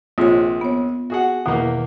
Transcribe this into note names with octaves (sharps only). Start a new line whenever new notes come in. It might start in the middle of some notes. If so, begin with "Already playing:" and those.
A#1 C3 G#3 F4 C#5
B3 C#5
F#4 G#4 F#5
E2 B2 D#3 A#3